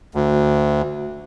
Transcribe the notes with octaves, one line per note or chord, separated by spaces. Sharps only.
D2